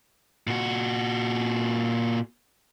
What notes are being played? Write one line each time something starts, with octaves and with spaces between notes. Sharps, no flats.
A#2 F#4